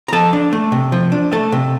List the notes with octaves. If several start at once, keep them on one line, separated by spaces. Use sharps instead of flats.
A#5
F3 A4 A5
D4
A3
C3
F3
D4
A3 A4 A5
C3